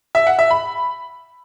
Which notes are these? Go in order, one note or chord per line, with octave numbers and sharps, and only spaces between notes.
E5
F#5
E5
B5